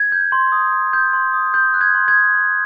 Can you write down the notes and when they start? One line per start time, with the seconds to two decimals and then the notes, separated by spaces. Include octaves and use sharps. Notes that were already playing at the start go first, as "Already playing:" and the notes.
Already playing: G#6
0.12 G6
0.32 C6
0.52 D#6
0.73 C6
0.93 G6
1.13 C6
1.33 D#6
1.54 C6 G6
1.74 F#6
1.81 G#6
1.95 C6
2.08 G#6
2.15 D#6
2.35 C6